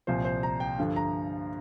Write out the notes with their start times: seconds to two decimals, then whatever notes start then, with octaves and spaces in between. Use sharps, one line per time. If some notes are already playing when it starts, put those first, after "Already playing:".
0.07 C2 A#2 F3 C5
0.25 C5
0.43 A#5
0.60 G5
0.78 G2 D3 F3
0.96 A#5